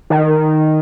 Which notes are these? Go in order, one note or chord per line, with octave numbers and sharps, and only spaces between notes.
D#3